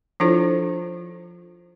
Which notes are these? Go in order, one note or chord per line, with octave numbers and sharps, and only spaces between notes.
F3 D4 E4 F4 A4 C5